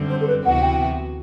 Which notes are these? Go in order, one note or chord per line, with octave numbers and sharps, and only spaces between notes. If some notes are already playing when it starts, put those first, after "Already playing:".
Already playing: F#2 D3 G3 C4
C5
A4
B4
D2 C3 E3 B3 F#4 F#5
G5